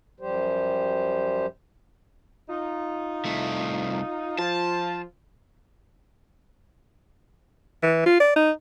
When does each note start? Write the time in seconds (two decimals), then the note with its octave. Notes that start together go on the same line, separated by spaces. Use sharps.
0.20 F#2 F3 G3 G4 C5
2.49 D#4 F4
3.25 C2 A3
4.39 F3 F4 A5
7.83 E3
8.06 F4
8.20 D5
8.36 D#4